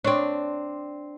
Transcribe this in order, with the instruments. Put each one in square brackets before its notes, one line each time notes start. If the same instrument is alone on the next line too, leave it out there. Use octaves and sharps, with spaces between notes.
[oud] C4 D4 [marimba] C#5 C#6